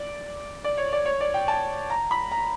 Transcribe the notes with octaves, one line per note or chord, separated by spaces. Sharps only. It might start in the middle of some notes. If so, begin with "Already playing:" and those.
Already playing: D5
D5
C#5
D5
C#5
D5
G5
A5
A#5
B5
A#5